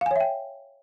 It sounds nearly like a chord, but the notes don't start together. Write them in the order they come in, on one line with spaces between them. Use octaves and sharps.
F5 G#5 C#5 E5 G5